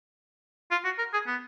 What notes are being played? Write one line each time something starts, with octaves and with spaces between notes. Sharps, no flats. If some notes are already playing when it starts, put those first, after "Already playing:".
F4
F#4
A#4
G#4
B3